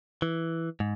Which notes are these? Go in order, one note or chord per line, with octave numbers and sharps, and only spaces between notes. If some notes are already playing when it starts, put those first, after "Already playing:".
E3
G#2